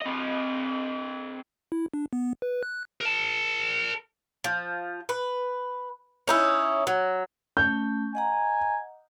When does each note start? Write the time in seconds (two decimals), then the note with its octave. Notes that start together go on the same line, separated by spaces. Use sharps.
0.02 C4 D#5
1.72 E4
1.94 D4
2.13 B3
2.42 B4
2.63 F#6
3.01 A#4 A5
4.44 F3
5.09 B4
6.28 C#4 D#4 E4
6.87 F#3
7.57 A3 C#4 G6
8.15 D#5 F#5 G#5 A#5